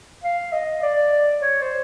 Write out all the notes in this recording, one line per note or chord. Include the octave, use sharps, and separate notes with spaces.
F5
D#5
D5
C#5
C5